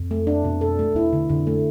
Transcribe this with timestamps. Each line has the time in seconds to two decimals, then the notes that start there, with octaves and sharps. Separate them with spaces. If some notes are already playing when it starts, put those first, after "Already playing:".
Already playing: F2
0.11 A3
0.27 D4
0.44 B2
0.61 A4
0.79 A3
0.95 E2 E4
1.13 D3
1.29 F2 D3
1.47 A3